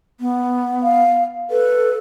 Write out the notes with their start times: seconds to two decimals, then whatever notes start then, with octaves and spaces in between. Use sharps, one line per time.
0.20 B3
0.83 F5
1.51 A4 B4